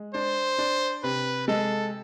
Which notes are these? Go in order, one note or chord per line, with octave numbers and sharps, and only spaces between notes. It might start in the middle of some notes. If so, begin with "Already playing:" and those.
Already playing: G#3
D4 C5
D4
C3 B4
G#3 A4